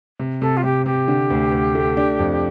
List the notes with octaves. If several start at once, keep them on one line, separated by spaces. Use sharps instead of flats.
C3
C3 A4
F4
C3 G4
C3 G4
D3
D2
D2
A3
D4
F2